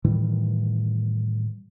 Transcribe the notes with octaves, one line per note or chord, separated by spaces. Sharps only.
A2 D#3 E3 G3